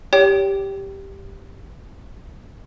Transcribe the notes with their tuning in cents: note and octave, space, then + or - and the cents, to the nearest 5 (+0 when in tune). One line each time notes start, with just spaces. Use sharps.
G4 +0 C#5 +25 G5 -15